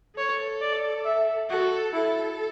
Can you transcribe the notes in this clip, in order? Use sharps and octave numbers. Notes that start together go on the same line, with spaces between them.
A4 C#5
D5
E5
F#4 A4
E4 A4